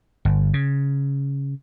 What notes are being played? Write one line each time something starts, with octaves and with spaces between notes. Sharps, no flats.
G1
C#3